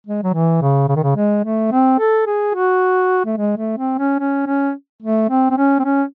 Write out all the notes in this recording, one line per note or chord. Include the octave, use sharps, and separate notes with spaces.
G#3
F#3
E3
C#3
C#3
D#3
C#3
G#3
A3
C4
A4
G#4
F#4
A3
G#3
A3
C4
C#4
C#4
C#4
A3
C4
C4
C#4
C4
C#4